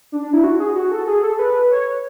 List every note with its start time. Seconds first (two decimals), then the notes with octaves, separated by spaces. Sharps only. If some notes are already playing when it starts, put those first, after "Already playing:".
0.12 D4
0.23 D4
0.33 E4
0.44 F#4
0.60 G#4
0.76 F#4
0.92 A4
1.07 G#4
1.23 A4
1.39 B4
1.71 C#5